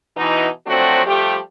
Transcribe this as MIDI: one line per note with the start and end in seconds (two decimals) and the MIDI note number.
0.16 0.48 47
0.16 0.48 52
0.16 0.48 63
0.67 1.04 53
0.67 1.04 54
0.67 1.04 57
0.67 1.04 60
0.67 1.04 62
0.67 1.04 66
1.06 1.37 53
1.06 1.37 55
1.06 1.37 57
1.06 1.37 67